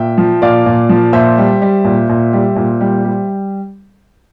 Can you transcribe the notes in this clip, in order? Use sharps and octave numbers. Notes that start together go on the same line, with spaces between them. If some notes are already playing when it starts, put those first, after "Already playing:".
Already playing: A#2 E5 G5
F3
A#2 D5 F5
A#2
F3
A#2 C5 E5
G3
G3
A#2
A#2
G3
A#2
G3
G3